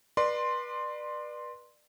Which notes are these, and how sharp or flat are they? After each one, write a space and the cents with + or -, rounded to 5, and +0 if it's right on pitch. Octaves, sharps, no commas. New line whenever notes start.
B4 -30 D5 +25 C6 +0